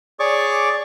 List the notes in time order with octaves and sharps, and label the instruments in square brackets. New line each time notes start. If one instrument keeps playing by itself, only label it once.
[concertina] G#4 C#5 D5 C#6 D6